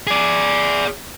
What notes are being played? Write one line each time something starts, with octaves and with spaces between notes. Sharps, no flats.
G#4 D5